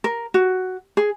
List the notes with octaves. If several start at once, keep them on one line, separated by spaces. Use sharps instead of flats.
A#4
F#4
G#4